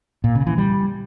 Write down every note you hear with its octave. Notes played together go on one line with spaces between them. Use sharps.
A#2
C#3
E3
G3